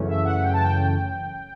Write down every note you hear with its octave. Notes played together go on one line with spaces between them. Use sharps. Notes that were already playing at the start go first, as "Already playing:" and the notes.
Already playing: F#2 C#3 E3 A3 C#4
E5
F#5
G5
A5
G5